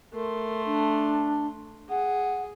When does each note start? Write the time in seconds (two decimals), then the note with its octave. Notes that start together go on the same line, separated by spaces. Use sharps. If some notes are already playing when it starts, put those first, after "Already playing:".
0.14 A3 A#4 C6
0.66 D4
1.90 G#4 F#5